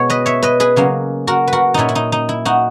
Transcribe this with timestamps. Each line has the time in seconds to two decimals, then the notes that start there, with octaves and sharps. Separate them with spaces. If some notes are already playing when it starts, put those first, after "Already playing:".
Already playing: B2 G#3 B3 C#5
0.10 B4 D#5
0.26 C#5 E5
0.43 B4 D#5
0.60 G#4 B4
0.76 C#3 F#3 A#3 C#4
1.27 F#4 A#4
1.48 B4
1.53 F#4 A#4
1.74 A#2 F#3 C#4 D#4 E4
1.89 E4
1.95 D#4
2.12 D#4
2.29 E4
2.45 D#4 F#4